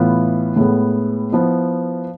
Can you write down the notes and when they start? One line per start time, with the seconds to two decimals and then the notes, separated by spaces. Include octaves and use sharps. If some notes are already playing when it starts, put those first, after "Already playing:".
Already playing: A2 E3 B3 F4
0.56 A2 G#3 B3
1.32 F3 B3 E4